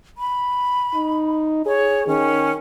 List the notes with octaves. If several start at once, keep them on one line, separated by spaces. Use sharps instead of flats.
B5
D#4
G#4 C#5
D#3 C#4